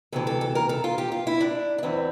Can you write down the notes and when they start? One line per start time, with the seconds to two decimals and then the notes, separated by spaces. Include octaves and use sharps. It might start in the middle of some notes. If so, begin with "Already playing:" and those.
0.12 D2 C3 E3 A4
0.27 A4
0.41 A4
0.55 A#4
0.69 A4
0.84 F4
0.98 G4
1.12 F4
1.27 E4
1.41 D4
1.78 D4
1.83 E2 E3 C4